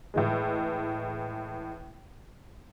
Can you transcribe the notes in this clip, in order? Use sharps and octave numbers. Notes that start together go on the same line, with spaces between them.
A2 E3 G#3